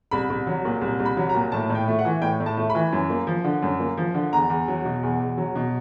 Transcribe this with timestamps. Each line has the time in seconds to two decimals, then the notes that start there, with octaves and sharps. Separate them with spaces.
0.11 C2 B5
0.30 C2
0.47 F#3
0.65 A#2
0.82 C2
1.00 C2
1.05 B5
1.17 F#3
1.29 A#5
1.35 A#2
1.52 A2 A5
1.70 A2
1.75 G5
1.88 A3
1.99 F#5
2.05 E3
2.22 A2 G5
2.40 A2
2.46 A5
2.57 A3
2.70 B5
2.75 E3
2.93 F#2
3.10 A#3
3.27 F3
3.44 D3
3.62 F#2
3.80 A#3
3.97 F3
4.14 D3
4.33 E2 A#5
4.50 E2
4.68 F#3
4.85 B2
5.03 E2
5.19 E2
5.38 F#3
5.56 B2